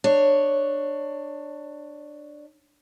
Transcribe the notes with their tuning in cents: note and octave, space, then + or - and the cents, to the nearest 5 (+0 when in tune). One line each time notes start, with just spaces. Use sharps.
D4 +15 C#5 +0